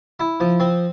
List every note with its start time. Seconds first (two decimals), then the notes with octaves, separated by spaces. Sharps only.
0.20 E4
0.40 F3
0.60 C4